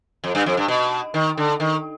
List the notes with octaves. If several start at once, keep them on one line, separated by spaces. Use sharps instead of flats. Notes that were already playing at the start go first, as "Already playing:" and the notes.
F2
G2
F2
G2
B2
D#3
D3
D#3